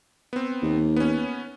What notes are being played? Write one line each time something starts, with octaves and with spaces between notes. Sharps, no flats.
B3 C4
D#2
B3 C#4